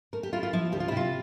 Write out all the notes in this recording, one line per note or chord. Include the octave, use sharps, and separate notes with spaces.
A3 A#4
G4
E4 F4
F4
F3 E4
D2 G4
F4
E4
C3 F4